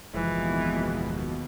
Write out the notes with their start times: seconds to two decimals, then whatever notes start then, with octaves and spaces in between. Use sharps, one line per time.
0.14 F#1 D#2 B2 E3 F3 G#3